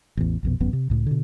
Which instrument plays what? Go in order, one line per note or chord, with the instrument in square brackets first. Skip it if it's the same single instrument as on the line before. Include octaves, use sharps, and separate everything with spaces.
[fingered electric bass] A1 E2
A#1 F2 B2
D1 G#1 F#2 B3
C3
C#2 A2
B2 D3